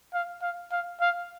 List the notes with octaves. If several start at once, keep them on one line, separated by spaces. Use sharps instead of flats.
F5
F5
F5
F5